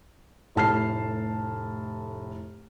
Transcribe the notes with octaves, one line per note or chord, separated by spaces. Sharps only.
F1 A2 A5 F6 C7